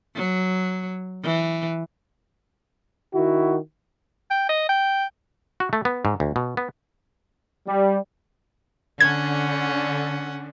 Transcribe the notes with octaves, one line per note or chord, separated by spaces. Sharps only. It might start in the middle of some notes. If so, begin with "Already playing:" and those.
F#3
E3
D#3 E4 F#4
G5
D#5
G5
F#4
A3
B3
G#2
D2
B2
B3
G3
D3 C#4 F#5 G#6